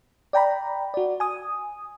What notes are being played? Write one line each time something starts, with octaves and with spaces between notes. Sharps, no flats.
D5 G5 A#5 B5
F#4 D5
G#5 D#6